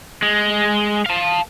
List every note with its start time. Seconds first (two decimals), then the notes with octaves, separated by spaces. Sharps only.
0.22 G#3
1.06 F5 A5